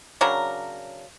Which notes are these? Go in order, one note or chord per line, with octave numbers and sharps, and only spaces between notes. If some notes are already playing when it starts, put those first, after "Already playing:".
C#3 F#3 D4 A#4